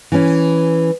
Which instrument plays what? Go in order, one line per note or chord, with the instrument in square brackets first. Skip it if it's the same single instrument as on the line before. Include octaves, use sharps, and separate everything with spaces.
[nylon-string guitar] E3 C#4